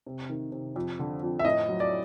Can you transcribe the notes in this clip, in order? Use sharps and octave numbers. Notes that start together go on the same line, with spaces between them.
C3
D#3
C3
F2
D3
F2
E5
A2 D#5
F#3
D5